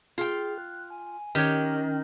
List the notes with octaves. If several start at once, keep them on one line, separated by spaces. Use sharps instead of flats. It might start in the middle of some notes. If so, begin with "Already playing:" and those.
F4 G#4 G5
F#6
G#5
D#3 C#4 G4 C#5